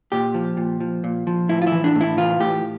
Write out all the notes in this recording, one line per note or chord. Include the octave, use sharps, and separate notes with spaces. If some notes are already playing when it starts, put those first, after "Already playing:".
A#2 G4
F3
A#2
F3
A#2
F3
A2 E4
F4
E4
E3
D4
A2
E4
E3 F4
A2 G4